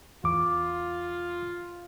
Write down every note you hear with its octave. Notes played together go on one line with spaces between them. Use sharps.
E2 F4 D6